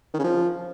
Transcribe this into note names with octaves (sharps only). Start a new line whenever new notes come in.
D#3
C#3
F3